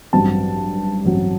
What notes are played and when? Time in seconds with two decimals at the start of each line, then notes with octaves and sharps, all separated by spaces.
0.13 A1 G2 F#3 C4 A5
1.05 A1 G2 F#3 C4